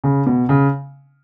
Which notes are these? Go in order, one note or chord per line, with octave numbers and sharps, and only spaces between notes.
C#3
B2
C#3